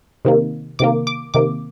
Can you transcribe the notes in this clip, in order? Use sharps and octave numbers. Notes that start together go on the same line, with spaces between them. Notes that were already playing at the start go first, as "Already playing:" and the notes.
C3 D#3 A#3
C3 D#3 A#3 D6
D6
C3 D#3 A#3 D6